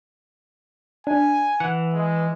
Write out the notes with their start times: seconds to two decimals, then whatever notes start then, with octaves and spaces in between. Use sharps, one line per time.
1.07 D4 G#5
1.60 E3 F#5
1.94 G#3